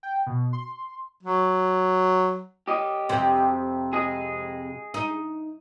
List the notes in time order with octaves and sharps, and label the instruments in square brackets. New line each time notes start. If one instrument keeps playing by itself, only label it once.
[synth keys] G5
B2
C6
[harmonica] F#3
[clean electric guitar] G4 D#5
[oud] F2 C3 C4
[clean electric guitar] G#4 D#5
[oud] D#4